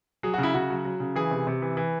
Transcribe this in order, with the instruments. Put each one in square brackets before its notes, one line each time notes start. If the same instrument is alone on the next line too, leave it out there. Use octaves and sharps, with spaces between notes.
[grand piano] F#3 G#4
C#3 F#4
E4
C#3 F#4
F#3
F#3
C#3
E3 G#4
C3
C3
E3
E3